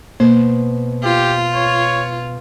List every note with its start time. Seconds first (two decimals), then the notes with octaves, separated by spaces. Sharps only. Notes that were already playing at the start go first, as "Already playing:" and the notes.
0.20 B2 A#3 C5
1.04 F4 G4
1.55 C#5